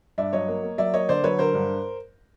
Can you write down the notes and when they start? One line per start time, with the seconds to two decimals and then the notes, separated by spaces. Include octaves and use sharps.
0.18 G2 D5 E5
0.33 F#3 C#5 D#5
0.48 A#3
0.63 A#3
0.78 F#3 D5 E5
0.93 A#3 C#5 D#5
1.08 D3 C5 D5
1.24 F#3 B4 C#5
1.39 D3 A#4 C5
1.54 G2